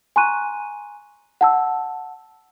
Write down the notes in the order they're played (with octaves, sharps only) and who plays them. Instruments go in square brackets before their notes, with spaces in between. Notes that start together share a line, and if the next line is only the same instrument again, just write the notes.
[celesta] G#5 A#5 C6 C#6 F#6 D#7
F#5 A5 E6